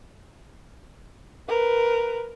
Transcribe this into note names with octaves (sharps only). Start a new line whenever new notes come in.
A#4 B4